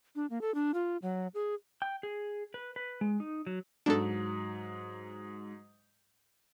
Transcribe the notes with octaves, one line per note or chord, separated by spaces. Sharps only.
D4
A#3
A4
D4
F4
F#3
G#4
G5
G#4
B4
B4
G#3
D#4
F#3
G#2 F#3 D4 A4